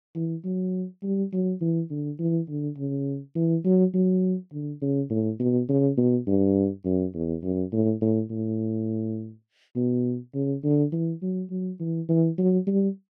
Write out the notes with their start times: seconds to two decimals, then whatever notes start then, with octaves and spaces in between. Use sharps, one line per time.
0.15 E3
0.44 F#3
1.03 G3
1.33 F#3
1.61 E3
1.90 D3
2.19 E3
2.49 D3
2.77 C#3
3.36 E3
3.65 F#3
3.94 F#3
4.52 D3
4.82 C#3
5.10 A2
5.40 B2
5.69 C#3
5.97 B2
6.27 G2
6.85 F#2
7.15 E2
7.43 F#2
7.73 A2
8.02 A2
8.30 A2
9.76 B2
10.34 C#3
10.64 D3
10.92 E3
11.22 F#3
11.50 F#3
11.80 E3
12.09 E3
12.38 F#3
12.67 G3